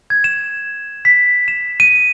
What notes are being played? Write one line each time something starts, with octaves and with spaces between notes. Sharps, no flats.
G#6
E7
B6
E7
D#7